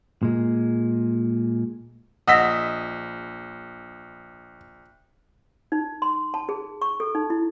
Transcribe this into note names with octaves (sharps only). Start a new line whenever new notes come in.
A#2 G#3
A#1 D#5 F#5 E6 A#6 B6
D#4
C6
A5
G#4
C#6
A4
D#4
E4